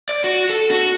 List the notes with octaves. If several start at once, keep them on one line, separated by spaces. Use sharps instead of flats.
D5
F#4
A4
F#4